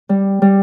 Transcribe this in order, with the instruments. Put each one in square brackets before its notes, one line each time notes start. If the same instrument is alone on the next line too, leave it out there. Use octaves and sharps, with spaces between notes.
[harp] G3
G3